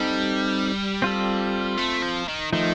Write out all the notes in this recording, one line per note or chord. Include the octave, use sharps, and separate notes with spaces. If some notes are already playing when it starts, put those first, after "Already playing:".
Already playing: G3 C4 D#4 A4
C4 F4 A4
A3
F3
D#3
D#3 F3 A3 D#4